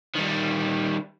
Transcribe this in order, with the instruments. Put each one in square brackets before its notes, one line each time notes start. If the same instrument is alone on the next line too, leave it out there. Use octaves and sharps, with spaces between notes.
[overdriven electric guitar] D#3 G3